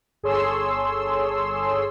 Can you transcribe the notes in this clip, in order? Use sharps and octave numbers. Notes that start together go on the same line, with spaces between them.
G1 G#4 A4 C#5 C6 E6